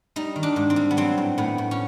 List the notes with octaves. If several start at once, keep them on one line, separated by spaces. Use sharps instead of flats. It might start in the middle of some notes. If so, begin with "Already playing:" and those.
G3 D#4
D#3
D4
G#2
C4
G3
B3
F#3 C4
A2
A2 B3
A2
C#4